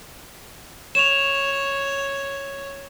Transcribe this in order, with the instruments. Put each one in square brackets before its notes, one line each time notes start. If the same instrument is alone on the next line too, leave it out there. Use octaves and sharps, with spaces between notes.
[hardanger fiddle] C#5 [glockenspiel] E7 F7